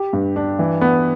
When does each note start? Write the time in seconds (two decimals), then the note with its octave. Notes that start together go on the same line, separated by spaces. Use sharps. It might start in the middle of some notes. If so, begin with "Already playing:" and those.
Already playing: G4
0.13 G2
0.36 D4
0.59 E3
0.81 B3